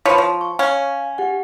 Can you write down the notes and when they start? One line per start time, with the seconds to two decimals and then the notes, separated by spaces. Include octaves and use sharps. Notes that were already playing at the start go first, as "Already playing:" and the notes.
0.05 F3 B4 C#5
0.18 F3
0.41 C#6
0.59 C#4 F5
1.18 G4 F#5